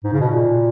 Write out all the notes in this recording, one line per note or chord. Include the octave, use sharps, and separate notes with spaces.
G#2
C#3
B2
A#2